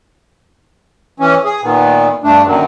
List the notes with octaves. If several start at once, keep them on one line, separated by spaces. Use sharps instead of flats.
E3 C#4
G#4
A#2 D#3 B3
G2 A3 D4
F#2 A#2 D3 D#3 F#3